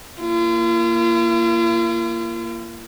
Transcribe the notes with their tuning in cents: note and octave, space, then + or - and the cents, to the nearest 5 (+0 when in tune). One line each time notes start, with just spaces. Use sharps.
A#3 +0 F4 -45